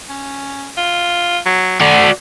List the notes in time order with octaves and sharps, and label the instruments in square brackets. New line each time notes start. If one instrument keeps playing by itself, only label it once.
[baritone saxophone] C#4
F4
F#3
[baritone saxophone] A3 [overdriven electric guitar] F#4 D5